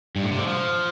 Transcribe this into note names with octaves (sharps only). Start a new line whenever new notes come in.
G2
A2
C3
D3
F3